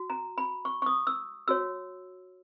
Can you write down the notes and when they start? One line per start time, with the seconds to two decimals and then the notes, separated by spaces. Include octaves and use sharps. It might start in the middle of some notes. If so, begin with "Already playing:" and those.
Already playing: F#4
0.10 A#5
0.38 B5
0.65 C#6
0.82 C#6
0.86 D#6
1.07 E6
1.48 F#4 C#5 E6